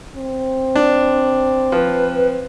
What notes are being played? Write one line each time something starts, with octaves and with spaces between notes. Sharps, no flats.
C4
D4
F3 B4